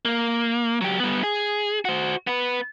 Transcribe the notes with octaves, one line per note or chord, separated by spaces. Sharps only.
A#3
F#3 G4
G3 B3
G#4
F#4 C5
B3 B4